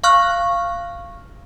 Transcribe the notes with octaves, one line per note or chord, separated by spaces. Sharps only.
F5 C#6 F6 F#6